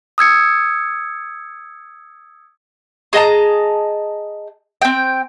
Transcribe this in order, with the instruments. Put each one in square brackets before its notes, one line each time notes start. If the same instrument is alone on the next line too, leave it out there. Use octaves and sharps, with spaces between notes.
[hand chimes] D#6 E6 G#6 C#7
[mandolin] G#4 D#5 A5 A#5
C4 G5